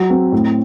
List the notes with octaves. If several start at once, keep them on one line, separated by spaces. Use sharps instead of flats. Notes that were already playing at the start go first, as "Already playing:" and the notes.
Already playing: F#3
C4
A2